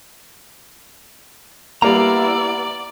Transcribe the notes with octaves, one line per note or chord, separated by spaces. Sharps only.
G3 A#3 B3 E4 D5 A#5